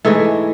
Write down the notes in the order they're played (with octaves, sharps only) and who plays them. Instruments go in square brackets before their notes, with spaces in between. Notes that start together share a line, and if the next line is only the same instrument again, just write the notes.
[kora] G#2 E3 G#3 A3